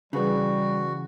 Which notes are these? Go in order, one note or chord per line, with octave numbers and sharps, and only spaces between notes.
C#3 E3 G3 C#4 F#4 G#4 B4